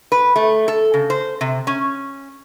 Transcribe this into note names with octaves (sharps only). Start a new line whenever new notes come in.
B4
A3
A4
C#3
C5
C3
C#4